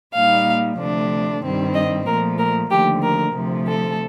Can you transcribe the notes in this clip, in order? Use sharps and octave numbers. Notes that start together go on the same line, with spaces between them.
A#2 G3 A#3 D#4 F5
D2 C3 F3 A3 D4
G2 D#3 G3 C4
D#5
A#2 F3 A3 A#4
A#4
D#2 D3 F3 A3 G4
A#4
D2 C3 F3 A3
A4